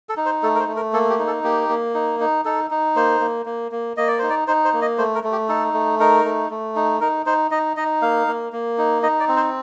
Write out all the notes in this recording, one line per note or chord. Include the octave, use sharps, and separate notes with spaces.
A4
D#4
C5
A3 A4
A#4
C5
A3
A#4
A#3 A4
G4
D#4
A4
A#3 G4
A#3
D#4
D#4
D#4 A4
D#4
A#3 C5
A#3
A#3
A#3
A#3 D#5
D5
D#4 C5
D5
D#4 C5
C5
A#3
D#5
A3 C5
A#4
A3
G4
D#4 A4
A3
D#4 A#4
A3
A3
D#4
D#4 A#4
D#4 C5
D#4 D#5
D#4 D#5
A#3 F5
A#3
A#3
D#4
D#4 D#5
D5
C4
C5